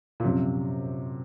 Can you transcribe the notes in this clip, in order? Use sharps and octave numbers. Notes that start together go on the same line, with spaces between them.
A#2
F#2 C3 F3 C4